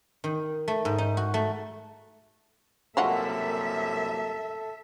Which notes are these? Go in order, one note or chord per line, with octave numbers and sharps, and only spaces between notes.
D#3
A3
G#2
D#4
F#4
A3
C2 F#2 G#3 A#3 F4 F#4 A4 E5